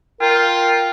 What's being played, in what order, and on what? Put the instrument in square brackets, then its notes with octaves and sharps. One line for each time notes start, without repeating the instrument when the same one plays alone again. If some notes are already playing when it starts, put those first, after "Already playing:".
[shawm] F4 [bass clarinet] A#4 [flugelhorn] G5